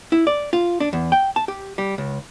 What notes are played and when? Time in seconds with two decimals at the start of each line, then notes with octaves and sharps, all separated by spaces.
0.12 E4
0.27 D5
0.53 F4
0.80 D4
0.93 E2
1.12 G5
1.36 A5
1.48 G4
1.78 G3
1.98 C#2